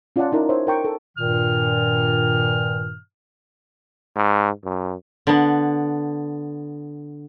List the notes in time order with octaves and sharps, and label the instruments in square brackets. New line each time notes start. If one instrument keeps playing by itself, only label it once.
[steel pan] C#4 F4 D5 D#5 F#5 A5
D#4 E4 A#4
C5 C#5 E5
A#4 G5 C#6
A4
[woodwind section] G2 A#2 D#3 F6
[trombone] G#2
F#2
[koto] D3 B3